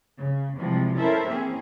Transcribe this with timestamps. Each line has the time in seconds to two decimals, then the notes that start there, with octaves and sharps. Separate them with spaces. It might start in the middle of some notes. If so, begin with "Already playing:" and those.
0.19 C#3
0.57 C3 E3 F3 G3 G#3
0.97 C#4 E4 A4 A#4 C5 E5
1.29 E3 A#3 C4 C#4 G#4